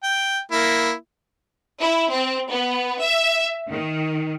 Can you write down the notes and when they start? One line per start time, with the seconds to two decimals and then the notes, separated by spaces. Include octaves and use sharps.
0.03 G5
0.52 A#3 E4
1.81 E4
2.11 C4
2.49 B3
3.01 E5
3.70 D#3